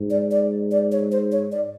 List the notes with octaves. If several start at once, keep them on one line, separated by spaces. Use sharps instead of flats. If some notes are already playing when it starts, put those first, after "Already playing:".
Already playing: G#2
D5
D5
D5
C#5
C5
C#5
D5